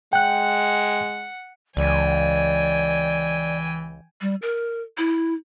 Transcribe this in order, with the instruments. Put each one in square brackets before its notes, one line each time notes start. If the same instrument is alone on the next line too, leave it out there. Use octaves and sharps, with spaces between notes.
[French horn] G#3 [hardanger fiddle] F#5 [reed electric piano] G5 F#6
[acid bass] C#2 [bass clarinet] E3 [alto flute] D5 [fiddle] G5 G#5
[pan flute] G3
A#4
E4